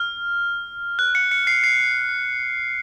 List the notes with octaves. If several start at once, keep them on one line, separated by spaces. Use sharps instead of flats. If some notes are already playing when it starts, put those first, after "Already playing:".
Already playing: F6
F#6
C#7
C#7
C7
C7